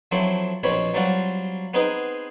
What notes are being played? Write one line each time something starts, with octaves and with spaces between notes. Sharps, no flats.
F3 F#3 A3 C4 E4
A#1 B2 C4 C#5 B5
F#3 G3 C4 F4 F#4
B3 C4 D#4 G#4 B4